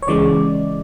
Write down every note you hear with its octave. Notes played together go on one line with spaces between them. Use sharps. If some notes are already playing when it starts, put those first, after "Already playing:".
C#5
C#2 C#3 E3 G#3 D5